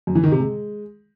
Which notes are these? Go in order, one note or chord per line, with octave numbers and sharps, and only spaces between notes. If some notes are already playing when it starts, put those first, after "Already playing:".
F#2
E3
D#3
C3
G#3